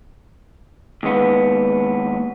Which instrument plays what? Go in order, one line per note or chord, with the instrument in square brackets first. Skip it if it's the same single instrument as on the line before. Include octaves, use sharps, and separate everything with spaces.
[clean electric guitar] D#2 G#3 B3